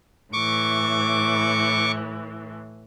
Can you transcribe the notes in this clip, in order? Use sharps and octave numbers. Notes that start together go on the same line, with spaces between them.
A2 E3 C#6 D6